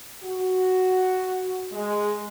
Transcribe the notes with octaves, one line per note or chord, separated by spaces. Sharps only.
F#4
G#3